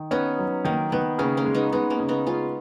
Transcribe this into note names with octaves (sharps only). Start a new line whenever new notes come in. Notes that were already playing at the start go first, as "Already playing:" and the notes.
Already playing: D#3
B3 C#4 D#4
F#3
D#3 A#3
D#3 B3
C#3 A#3 C#4
A#3 C#4
G#3
B3 D#4
G#3 B3 D#4
A#3 C#4
C#3
B3 D#4
G#3 C#4 F4